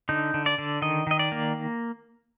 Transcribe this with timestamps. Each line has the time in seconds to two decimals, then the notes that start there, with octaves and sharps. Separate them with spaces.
0.09 D3 D#4
0.34 D3
0.46 D5
0.58 D3
0.82 D#3 D#5
1.07 D#3 D#5
1.19 D5
1.32 A#3